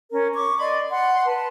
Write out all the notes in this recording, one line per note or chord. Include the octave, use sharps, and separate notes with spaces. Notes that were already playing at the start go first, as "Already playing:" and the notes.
C#4 A#4
C#6 D6
D5 D#5 B5 C6
F#5 B5 C6
B4 A5